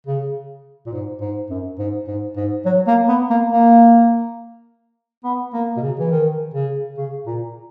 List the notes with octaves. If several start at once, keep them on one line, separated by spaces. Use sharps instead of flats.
C#3
A#2
G#2
G#2
F#2
G#2
G#2
G#2
F#3
A#3
B3
A#3
A#3
B3
A#3
B2
C#3
E3
D#3
C#3
C#3
A#2